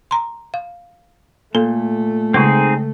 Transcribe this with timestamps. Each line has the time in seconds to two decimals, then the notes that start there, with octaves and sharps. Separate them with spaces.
0.11 A#5 C6
0.54 F5
1.55 A#2 A3 A4
2.34 C#3 G#3 C4 D#4 G#4